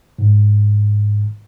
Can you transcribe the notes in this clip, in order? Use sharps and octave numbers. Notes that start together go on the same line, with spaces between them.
G#2